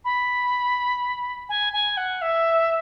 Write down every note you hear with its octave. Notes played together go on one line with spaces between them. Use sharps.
B5
G#5
G#5
F#5
E5